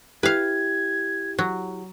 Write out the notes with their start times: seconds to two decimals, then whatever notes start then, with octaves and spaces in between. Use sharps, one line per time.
0.23 E4 G4 B4 F5 G#6
1.39 F#3